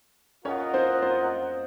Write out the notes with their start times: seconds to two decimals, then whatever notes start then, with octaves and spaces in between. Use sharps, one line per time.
0.45 C#4 F4 A#4 C#5 D#5 F#5
0.74 C4 C5
1.02 C4 C5